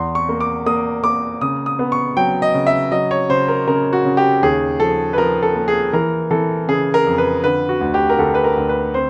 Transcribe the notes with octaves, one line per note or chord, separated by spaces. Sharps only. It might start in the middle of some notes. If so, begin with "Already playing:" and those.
Already playing: E2 C6
C#6
A#3
D6
A#3 D#6
A#3 D6
C#3 D#6
D#6
B3
C#6
F#3 G5
D#5
C#3
E5
F#3 D#5
C#5
C#3 C5
A#4
C#3 A#4
F#4
C#3
G4
D#2 G#4
F3 A4
B4
F3 A#4
A4
A#3
G#4
E3 A#4
E3 A4
C#3 G#4
A#4
F2
B4
D3 B4
F#4
D2
G4
A#4
D2 A4
B4
A#4
D2
B4
C4 C5